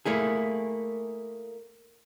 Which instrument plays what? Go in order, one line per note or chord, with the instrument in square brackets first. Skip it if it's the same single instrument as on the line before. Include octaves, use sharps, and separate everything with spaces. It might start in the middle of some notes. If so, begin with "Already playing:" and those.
[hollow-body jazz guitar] A3 A#3 E4 G#4